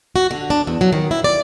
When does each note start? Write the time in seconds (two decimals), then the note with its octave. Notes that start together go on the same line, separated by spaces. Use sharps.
0.16 F#4
0.31 D3
0.50 D4
0.67 E2
0.81 F#3
0.93 D#3
1.11 E4
1.24 D5